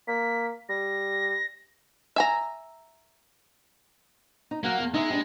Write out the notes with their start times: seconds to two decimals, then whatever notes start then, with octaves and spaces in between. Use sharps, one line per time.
0.08 A#3 B6
0.69 G3 A#6
2.16 E5 G#5 A#5
4.51 D#4
4.64 F#3 A#3 F#5
4.80 E2
4.94 G#3 D#4 E4 E5
5.10 G3 D4